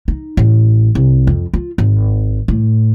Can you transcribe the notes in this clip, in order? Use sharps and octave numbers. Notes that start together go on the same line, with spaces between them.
D#4
A1
C2
F2
F4
G#1
A2